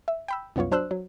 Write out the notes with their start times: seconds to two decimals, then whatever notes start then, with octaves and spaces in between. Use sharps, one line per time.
0.08 E5
0.28 G5 B5 E6
0.56 C2 F#2 B3 F4 C#5
0.71 F#3 D4 C5 E6 F#6
0.91 F#3